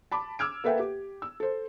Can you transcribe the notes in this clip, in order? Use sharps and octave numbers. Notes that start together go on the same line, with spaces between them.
A5 B5 D6
D6 E6 F6 G#6 D7
A#3 A4 B4 E5 F#5 G5
G4
E6
A4 C5